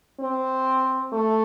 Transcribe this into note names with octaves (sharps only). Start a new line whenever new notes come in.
C4
A3